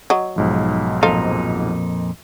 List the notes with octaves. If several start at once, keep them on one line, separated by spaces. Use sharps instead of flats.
F#3 D#5
B1 G#2 F3
F2 A#2 D#4 A4 C5 F5